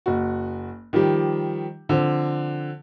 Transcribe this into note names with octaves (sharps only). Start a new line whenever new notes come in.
F#1 F#4
D#3 F3 G3 G4
D3 F3 C4